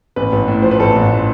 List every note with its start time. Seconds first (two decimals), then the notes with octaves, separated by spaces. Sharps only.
0.16 A1 B4
0.32 A1
0.48 A2
0.62 F3 C5
0.71 B4
0.79 A1 A4
0.96 A1
1.12 A2